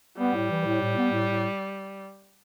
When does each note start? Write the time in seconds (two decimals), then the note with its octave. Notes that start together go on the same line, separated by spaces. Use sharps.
0.18 G3 B3
0.34 A2
0.50 E3
0.65 A2
0.81 A2
0.97 B3
1.11 A2
1.28 A2